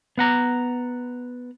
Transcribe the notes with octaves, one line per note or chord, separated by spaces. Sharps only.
B3 F#5 A#5